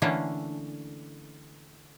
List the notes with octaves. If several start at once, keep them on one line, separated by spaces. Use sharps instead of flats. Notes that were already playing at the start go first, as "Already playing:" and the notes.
D3 E3 A3 A#3 C#4 D4